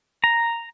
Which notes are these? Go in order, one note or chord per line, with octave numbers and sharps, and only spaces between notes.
A#5